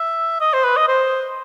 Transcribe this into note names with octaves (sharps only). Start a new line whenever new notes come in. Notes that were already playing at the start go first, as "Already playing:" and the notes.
Already playing: E5
D#5
C5
B4
D#5
C5